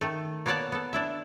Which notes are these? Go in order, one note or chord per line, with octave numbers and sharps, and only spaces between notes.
D#3 A3
A#3 B3 C#5 D5 F#5 A5
B3 A4
D4 E4 E5